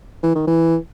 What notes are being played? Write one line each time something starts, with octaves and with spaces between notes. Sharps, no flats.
E3
D#3
E3